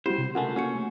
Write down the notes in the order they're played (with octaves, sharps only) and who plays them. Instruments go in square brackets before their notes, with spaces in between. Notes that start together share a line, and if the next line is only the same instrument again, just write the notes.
[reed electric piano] G3 F#4 G4 [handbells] C4 E4 [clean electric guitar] C5
[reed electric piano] C3
[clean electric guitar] C#2 A3 [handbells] F4 A#4 G#5 [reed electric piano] F#5
[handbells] A#3 F#4 C#7 [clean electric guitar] C#4
[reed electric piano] A3